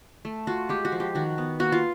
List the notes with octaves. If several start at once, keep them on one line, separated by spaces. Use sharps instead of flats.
A3
F4 F#4
G#3 G4
F#4
F3
G4
D#3 F#4
B3
A#3 F#4
F4